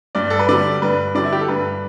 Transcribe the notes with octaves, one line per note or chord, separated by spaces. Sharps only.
G2 D5
A4
B4
D3 G3 D5
G2 B4
D3 G3 D5
E4
G4
A4
G2 B4